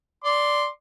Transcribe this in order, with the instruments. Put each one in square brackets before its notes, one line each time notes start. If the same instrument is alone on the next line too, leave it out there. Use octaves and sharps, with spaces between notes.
[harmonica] D5 C6 D6